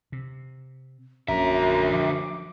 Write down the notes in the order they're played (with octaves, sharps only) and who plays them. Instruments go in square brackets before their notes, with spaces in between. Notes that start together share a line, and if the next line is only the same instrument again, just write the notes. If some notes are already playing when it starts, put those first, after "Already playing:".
[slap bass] C3
[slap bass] A#1 [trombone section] F#2 [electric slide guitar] D3 E5 [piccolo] A#5
[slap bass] F3 [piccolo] D6